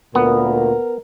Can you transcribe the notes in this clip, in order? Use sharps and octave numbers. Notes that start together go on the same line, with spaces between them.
D2 A#2 B3 A#4